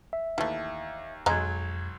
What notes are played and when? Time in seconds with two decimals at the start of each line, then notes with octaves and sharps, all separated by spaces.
0.13 E5
0.38 D#2 E3 A3
1.26 B1 F2 F#3 G#3 D#5 A#5 G#6